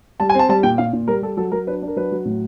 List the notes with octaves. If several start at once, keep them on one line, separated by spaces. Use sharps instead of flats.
G3 A5
G#5
C4 A5
G3 A5
A#2 G5
A#2 F5
A#2
G3 A#4
G3 A4
F#3 A4
F#3 A#4
D4 B4
D4
A#4
F#3 B4
F#3
A2